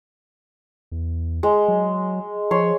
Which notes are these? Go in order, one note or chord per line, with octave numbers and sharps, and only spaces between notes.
E2
G#3
F#3
F3 C#5 C6